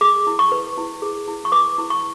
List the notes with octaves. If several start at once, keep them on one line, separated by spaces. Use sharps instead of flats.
G#4 D6
E4
C#6
B4
E4
G#4
E4
C#6
B4 D6
E4
C#6